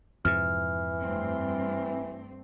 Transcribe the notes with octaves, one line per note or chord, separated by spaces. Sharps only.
F2 G#2 C3 E3 F6
G2 A3 C4